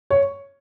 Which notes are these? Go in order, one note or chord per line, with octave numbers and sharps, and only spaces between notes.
C#5